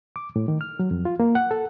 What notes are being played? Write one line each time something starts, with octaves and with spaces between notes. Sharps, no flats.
D6
A2
D#3
F6
F#3
F2
F4
A#3
F#5
A4